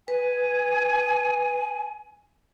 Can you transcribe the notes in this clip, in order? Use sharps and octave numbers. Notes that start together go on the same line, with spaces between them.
B4 G#5